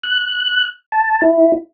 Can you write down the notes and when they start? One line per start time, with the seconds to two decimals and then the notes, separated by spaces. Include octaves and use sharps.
0.03 F#6
0.92 A5
1.22 E4